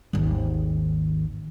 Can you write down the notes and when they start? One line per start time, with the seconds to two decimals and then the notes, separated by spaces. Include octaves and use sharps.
0.13 G#1 D#2